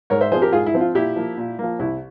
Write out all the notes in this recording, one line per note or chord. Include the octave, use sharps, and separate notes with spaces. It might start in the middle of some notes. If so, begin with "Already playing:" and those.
G#2 A#4 C#5
C5 E5
F3 C4 G#4 C5
G4 A#4
G#2 F4 G#4
E4
F3 C4
F4
A#2 E4 G4
F3 A#3
A#2
F3 A#3
C2 E4